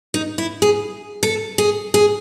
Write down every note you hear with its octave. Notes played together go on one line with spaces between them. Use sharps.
D#4
E4
G#4
A4
G#4
G#4